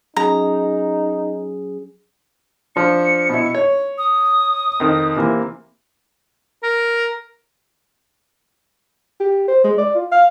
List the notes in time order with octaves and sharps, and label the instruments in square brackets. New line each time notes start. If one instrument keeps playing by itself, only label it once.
[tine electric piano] F#3 C#4 G#4 [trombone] D#4 [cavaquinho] A#5
[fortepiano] F3 D4 [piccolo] C#7
[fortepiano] B2 E4
C#5
[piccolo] D#6
[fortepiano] F2 D#3
C3 E3 A#3
[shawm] A#4
[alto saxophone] G4
C5
G#3
D5
F4
F5